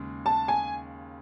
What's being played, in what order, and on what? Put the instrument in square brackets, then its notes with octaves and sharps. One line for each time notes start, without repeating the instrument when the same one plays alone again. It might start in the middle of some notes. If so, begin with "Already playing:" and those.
Already playing: [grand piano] D#2 C#3 G#3
[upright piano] A5
G#5